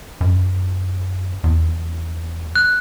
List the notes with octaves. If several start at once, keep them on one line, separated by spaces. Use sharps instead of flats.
F#2
E2
F#6